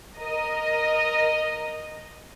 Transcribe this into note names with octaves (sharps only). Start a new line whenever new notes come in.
A#4 D#5